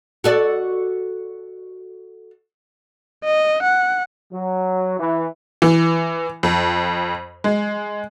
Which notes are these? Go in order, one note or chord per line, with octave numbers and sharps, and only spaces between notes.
F#4 A4 D5
D#5
F#5
F#3
E3
E3
F2
G#3